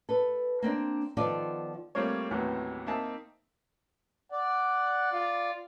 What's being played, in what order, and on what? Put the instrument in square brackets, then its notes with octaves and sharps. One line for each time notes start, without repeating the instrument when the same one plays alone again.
[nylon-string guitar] A4 B4
A#3 C4 D4
D#3 F3 B3 F4 A4 D5
[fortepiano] G3 A3 A#3 C4 F4 C#5
D#2 A2 C3 E3 F#3 B3
A#3 C4 D#4 E5 A5
[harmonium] D5 [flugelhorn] F#5
[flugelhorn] F4